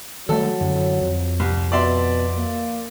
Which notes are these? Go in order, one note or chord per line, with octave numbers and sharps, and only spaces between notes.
D#3 F#3 G3 A3 A4
F#2 D3
F2
C2
B2 D5 E5 C6
A#3